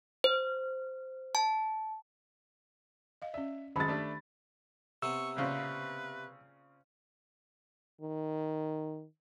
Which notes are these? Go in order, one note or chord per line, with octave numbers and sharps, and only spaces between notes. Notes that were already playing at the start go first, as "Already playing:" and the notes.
C5
A5
D#5 F5
C#4 D5 E5
F#2 D#3 G#3 A5 B5 A6
A3 D4 G4 D5
C3 B3 C#6 E6
A#2 C#3 C4 B4
D#3